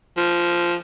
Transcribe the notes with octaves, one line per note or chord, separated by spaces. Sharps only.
F3